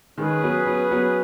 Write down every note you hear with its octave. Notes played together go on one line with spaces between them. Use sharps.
D#3 G#3 C#4 G#4 B4
F#3 B3
F#3 B3
F#3 B3